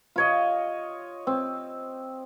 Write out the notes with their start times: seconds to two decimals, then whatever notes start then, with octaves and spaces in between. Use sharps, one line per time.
0.16 F4 C#5 D#5
1.27 C4